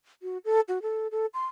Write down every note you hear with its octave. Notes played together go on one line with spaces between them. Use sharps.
F#4
A4
F#4
A4
A4
C6